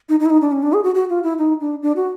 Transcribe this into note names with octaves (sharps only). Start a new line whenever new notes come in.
D#4
D#4
E4
D#4
D4
C#4
D4
G#4
F#4
F#4
F4
E4
D#4
D4
D4
F#4